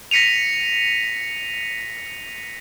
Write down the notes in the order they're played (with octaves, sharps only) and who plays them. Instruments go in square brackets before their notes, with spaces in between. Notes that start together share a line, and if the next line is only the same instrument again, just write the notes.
[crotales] A#6 B6 C#7 D#7 F7